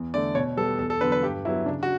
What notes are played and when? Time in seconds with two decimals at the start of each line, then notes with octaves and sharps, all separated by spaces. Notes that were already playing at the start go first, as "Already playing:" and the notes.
Already playing: E2
0.14 D3 A3 D5
0.35 B2 C#5
0.57 G3 B3 A4
0.79 E2 A4
0.90 A4
1.01 D3 F#3 B3 B4
1.12 B4
1.23 G2 G4
1.45 F#3 E4
1.49 B3
1.66 C#3 D4
1.83 F#4